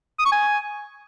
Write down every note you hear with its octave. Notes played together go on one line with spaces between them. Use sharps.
D#6
C#6
G#5